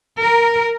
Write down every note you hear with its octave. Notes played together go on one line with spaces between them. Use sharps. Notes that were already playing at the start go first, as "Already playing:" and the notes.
A#4